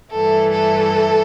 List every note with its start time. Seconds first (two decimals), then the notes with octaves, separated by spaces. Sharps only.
0.11 G2 E3 A3 A4
0.51 A4